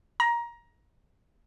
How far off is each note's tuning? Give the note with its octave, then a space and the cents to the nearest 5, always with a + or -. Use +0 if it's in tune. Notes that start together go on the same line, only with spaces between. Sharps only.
A#5 +20